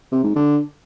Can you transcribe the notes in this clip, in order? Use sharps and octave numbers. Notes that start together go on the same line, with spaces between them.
C3
G#2
D3